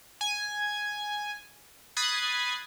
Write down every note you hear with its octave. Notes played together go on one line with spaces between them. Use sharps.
G#5
B5 D#6 F#6 G#6 A6 C7